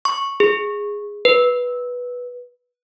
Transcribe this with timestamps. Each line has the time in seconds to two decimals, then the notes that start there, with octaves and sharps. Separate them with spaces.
0.05 C#6
0.40 G#4
1.25 B4